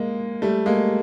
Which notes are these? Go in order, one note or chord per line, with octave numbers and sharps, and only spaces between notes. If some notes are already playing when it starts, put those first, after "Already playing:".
Already playing: G#3 A#3
G3 A3
G#3 A#3